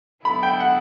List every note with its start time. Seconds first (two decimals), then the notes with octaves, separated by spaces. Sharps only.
0.25 D3 F#3 B3 E4 A4 B5
0.43 G5
0.60 F#5